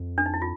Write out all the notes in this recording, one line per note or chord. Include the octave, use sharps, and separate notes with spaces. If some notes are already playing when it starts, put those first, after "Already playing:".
Already playing: F2
D4
D#4
E4
F4